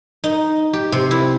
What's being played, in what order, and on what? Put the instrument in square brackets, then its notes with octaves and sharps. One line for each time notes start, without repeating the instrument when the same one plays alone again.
[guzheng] D#4
G4
C3
E4